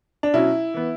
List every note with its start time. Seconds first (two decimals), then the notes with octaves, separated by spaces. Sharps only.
0.23 D4
0.33 B2 F#3 C#4 E4
0.74 E3 B3